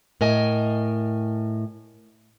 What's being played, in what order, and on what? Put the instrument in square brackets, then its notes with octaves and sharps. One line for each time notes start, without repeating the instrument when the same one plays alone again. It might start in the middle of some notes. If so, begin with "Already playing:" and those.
[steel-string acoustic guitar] A2 A#4 D#5 G#5